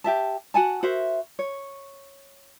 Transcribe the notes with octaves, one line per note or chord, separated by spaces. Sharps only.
G4 E5 A5
F#4 F#5 G#5 A5
F#4 A#4 C5 E5
C#5